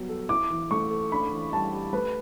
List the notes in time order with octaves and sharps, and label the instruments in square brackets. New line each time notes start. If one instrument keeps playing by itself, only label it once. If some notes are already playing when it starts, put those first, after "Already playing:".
Already playing: [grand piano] F#3 G3 B3 F#4
A4
[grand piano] E4 [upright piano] D6
[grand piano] E3
[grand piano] A3 [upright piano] C#6
[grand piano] A4
[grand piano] D4 [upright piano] B5
[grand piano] E3
[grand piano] G3 [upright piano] A5
[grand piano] G4
[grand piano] A3 [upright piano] B4